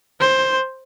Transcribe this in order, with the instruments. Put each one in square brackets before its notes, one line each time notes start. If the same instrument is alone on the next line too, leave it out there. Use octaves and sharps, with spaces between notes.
[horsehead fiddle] C5